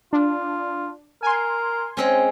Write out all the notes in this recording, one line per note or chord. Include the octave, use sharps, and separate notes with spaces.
D4 F4
A#4 G#5 C6
G#3 C4 C#4